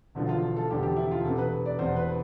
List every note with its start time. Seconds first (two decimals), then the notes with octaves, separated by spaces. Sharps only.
0.15 E1 E2 D3 F3
0.29 F4
0.57 A4
0.70 E1 E2 D3 F3 G4
0.83 G4
0.96 E4
1.11 F4
1.24 E1 E2 C3 A4
1.38 B4
1.66 D5
1.79 E1 E2 C3 C5
1.96 B4